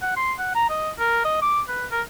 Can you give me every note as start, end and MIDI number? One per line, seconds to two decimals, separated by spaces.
0.02 0.16 78
0.17 0.33 84
0.39 0.52 78
0.55 0.69 82
0.70 0.90 75
0.99 1.24 70
1.24 1.40 75
1.42 1.61 86
1.68 1.85 71
1.91 2.01 70